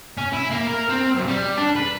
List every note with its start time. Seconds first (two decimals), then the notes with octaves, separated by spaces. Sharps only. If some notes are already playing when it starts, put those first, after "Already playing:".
0.17 C#4
0.33 E4
0.50 A#3
0.67 A#4
0.89 C4
1.15 B1
1.28 G3
1.57 D4
1.76 B4